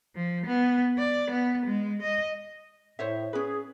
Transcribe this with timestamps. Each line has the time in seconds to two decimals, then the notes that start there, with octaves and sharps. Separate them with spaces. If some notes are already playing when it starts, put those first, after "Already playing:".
0.15 F3
0.46 B3
0.99 D5
1.31 B3
1.66 G#3
2.02 D#5
2.99 A2 C5 C#5 E5
3.33 C#4 G#4 B4